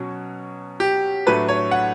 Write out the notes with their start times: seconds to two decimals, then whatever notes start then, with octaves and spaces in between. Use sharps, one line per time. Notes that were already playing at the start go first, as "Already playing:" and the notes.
Already playing: B2 F#3 C#4
0.80 G4
1.26 A2 F#3 A3 D4 B4
1.49 C#5
1.71 F#5